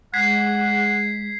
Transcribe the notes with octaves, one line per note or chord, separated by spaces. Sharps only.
G#3 F#5 G#6 B6 C7